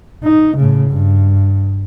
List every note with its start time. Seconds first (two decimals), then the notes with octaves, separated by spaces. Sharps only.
0.24 D#4
0.57 A2 C#3
0.91 G2